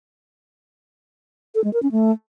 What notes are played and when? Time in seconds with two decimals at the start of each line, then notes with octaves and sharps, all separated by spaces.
1.55 A4
1.64 G#3
1.73 A#4
1.83 C#4
1.92 A3